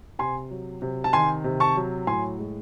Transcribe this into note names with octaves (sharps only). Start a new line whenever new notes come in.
C3 G#5 C6
F#3
C3
A5
D#3 G#5 C6
C3
A5 C#6
F#3
A2 G#5 C6
G#3